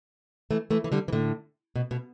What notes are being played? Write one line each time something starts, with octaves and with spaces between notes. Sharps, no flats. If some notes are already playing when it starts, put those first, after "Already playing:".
E3 A3
E3 A3
E3
D3 G3
E3
A2 D3
B2
B2